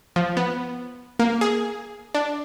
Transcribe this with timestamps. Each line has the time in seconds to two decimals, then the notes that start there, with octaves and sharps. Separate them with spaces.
0.16 F3
0.37 B3
1.19 A#3
1.41 G#4
2.15 D4